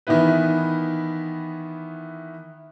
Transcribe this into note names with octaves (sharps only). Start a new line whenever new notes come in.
D#3 E3 B3 E4 B4